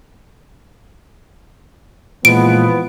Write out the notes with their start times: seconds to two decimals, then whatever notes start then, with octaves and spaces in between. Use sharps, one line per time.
2.25 A#2 E3 F3 G#3 B3 D7